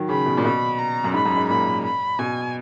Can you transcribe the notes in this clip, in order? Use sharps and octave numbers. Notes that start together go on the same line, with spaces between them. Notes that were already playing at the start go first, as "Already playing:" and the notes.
Already playing: D#3 F#3
C#3 B5
B2
A#2
B2 B5
A#5
F#2
G#2 B5
F#2
G#2
A#2 B5
B5
B2 G#5